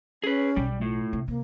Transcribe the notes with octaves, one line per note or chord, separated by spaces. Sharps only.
C#4 G#4 B4
B1 G3
A2 F4
C3
C3 A#3